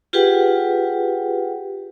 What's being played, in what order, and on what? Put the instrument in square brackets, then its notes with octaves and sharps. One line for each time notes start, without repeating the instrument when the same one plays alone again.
[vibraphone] F4 G4 G#4 B4 F#5 G5